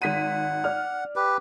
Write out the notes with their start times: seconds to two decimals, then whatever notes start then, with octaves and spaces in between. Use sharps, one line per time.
0.02 G#1 F#5 B6 D#7
0.64 D5 F6
1.16 G4 B4